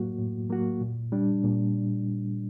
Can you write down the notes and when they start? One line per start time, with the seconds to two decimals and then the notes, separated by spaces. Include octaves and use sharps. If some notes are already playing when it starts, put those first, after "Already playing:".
Already playing: A2 F#3 A#3 F#4
0.18 A2
0.50 F#3 A#3 F#4
0.81 A#2
1.12 G3 D4
1.44 A#2